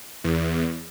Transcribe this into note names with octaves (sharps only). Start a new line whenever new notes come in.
E2